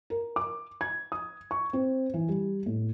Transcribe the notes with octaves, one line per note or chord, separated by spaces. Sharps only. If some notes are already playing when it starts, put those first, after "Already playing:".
A#4
D6
G#6
D#6
C#6
C4
E3
G3
A2